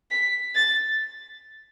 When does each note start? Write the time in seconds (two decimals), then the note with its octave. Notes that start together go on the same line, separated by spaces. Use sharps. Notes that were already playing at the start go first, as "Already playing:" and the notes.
0.11 B6
0.55 A6